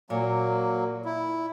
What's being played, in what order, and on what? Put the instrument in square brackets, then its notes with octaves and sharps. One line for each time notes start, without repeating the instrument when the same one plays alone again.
[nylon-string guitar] A#2 [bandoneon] F#3 A#3
[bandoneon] E4